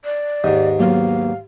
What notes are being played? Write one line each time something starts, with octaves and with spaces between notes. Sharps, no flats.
D5
D#2 G#2 D#5
F#3 A#3 B3 F5